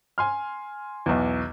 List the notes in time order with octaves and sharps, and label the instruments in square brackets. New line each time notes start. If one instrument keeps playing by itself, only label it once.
[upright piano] G#5 C6 F6
B1 E2